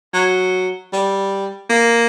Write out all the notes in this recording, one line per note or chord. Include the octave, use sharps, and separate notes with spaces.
F#3
G3
A#3